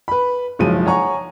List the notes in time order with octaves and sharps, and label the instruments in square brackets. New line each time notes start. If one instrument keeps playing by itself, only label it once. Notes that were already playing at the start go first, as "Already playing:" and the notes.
[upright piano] B4 B5
F#1 B1 F3 F#3 G#3 D#7
C#5 F#5 G#5 A#5 C#6